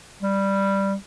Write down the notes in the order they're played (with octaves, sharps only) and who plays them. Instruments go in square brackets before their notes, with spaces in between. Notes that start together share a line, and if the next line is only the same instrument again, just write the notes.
[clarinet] G3